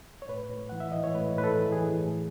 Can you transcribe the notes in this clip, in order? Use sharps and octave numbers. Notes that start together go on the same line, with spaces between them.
C#5
A2 B4
A2
E3 F#5
E5
E3 D#5
C#5
A2 B4
A2 B4
A4
E3
G#4
E3
A2